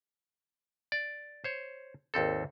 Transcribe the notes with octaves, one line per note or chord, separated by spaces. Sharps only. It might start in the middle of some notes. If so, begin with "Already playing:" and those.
D5
C5 C#5
G#1 D#2 C4 A4